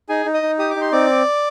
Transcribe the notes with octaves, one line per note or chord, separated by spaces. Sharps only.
D#4 G#4 G#5
D#4
D#5 D#6
D#4
G4 D#6
D6
D#4
C6
C4 D5 D6